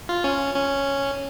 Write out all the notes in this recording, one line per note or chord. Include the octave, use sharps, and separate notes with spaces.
F4
C#4
C#4